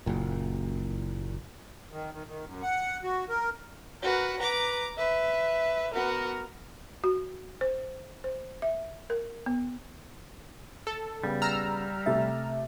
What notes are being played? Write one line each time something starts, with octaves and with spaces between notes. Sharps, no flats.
F#1 A#2
D#3
D#3
D#3
F#2
F#5
F#4
A#4
F#4 A#4 B4
B4 A#5 D6
B4 E5
B3 F#4 A#4
F#4
C5
C5
E5
A#4
B3
A4
C#3 G3 B3 G5
A#5 E6 F6
C3 A3 E5 A6